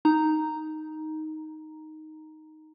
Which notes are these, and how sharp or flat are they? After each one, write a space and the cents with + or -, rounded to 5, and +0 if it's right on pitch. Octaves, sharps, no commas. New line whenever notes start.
D#4 +0 A#5 +0